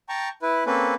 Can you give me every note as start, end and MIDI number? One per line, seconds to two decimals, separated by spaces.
0.09 0.29 79
0.09 0.29 81
0.09 0.29 82
0.09 0.29 85
0.42 0.64 64
0.42 0.64 71
0.66 0.94 58
0.66 0.94 60
0.66 0.94 61
0.66 0.94 69
0.66 0.94 71